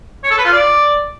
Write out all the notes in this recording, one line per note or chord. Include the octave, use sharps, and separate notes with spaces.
C#5
A4
B4
F4
D5